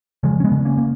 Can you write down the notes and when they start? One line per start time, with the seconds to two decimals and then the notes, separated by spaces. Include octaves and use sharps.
0.23 C#3 F3 G#3
0.40 C#4
0.44 G#3 B3
0.52 C#3
0.65 A#3 C#4
0.78 A#3